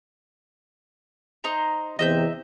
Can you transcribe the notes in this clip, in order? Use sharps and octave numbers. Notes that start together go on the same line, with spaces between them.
D#4 C5 A#5
E2 C3 D#5 E5 G6